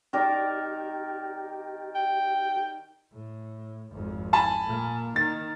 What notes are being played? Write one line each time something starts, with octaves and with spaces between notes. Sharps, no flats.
D#3 G4 A#4 D5
G5
A2
G#1 F2
G#5 A5 B5
A#2 A#3
D#3 A6